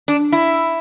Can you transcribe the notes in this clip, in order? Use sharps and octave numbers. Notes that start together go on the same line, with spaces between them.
D4
E4